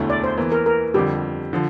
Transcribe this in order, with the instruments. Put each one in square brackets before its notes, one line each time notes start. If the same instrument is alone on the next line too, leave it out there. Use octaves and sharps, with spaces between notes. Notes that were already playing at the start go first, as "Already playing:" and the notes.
Already playing: [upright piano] E1 D2 D3 A3 E4
[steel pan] D5
C5
[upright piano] E2 E3 A#3
[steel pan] A#4
A#4
[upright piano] F2 D3 G3 [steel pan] G4
[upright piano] D3 F3